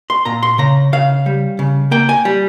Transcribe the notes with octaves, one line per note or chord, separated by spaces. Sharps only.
C6
A#2 A#5
C6
C#3 A#5
C#3 F5
G3
C#3
A#3 G5
G#5
G3